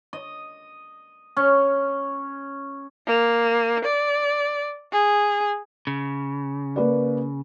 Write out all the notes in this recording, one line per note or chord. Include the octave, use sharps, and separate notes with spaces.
D#5
C#4
A#3
D5
G#4
C#3
A#3 B4 D5